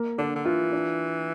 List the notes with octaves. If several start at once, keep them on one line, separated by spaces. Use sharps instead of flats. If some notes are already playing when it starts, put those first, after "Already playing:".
Already playing: A#3
D3 D4
D3
E3 F4
D4